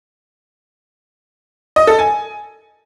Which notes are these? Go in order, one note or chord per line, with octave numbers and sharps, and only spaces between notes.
D#5
A4
G#5